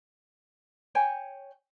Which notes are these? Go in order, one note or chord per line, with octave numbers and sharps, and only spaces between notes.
C#5 G5 G#5